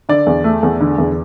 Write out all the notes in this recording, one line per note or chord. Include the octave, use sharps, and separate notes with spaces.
D3 D5
E2
A3
E2
D3
E2